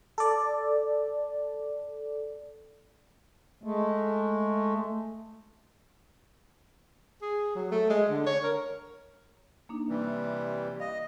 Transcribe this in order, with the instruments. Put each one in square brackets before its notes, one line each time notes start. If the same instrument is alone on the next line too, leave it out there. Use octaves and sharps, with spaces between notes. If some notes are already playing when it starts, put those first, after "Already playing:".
[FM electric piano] A4 D5
[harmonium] G#3 A3
[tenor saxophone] G#4
F#3
A3
G#3
D3
C#5
A#4
[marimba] A#3 D4 D#4
[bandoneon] C3 E3 G3
[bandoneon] D#5 [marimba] F5